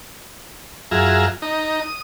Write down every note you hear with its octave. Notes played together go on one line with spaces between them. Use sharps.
F#2 F4 G#4 E5 A#5
D#4 A#5
D#6